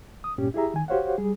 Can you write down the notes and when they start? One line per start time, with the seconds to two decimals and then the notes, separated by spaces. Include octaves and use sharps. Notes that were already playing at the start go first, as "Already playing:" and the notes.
0.24 D#6
0.38 G2 A#2 C#4 G4
0.54 E4 G4 G#4 E5 A#5
0.74 D#3 G#5
0.88 F#4 G4 C5 C#5 F5 F#5
1.18 G3 G#4